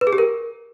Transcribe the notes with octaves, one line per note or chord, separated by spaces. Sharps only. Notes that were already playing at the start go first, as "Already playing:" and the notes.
B4
G#4
G4
A#4